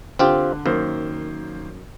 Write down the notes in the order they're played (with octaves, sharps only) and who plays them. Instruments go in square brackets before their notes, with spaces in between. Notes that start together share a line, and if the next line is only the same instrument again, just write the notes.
[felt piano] D3 [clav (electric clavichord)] C4 F4 G4
[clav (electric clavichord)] F#2 [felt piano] D#3 A#3 C5